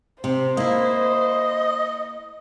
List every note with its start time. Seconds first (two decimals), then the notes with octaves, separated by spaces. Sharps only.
0.24 C3 C5
0.57 A#3 E4 D#5